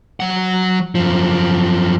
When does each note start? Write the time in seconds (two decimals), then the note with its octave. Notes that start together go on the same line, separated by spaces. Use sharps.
0.20 F#3 F#5
0.95 F#2 F3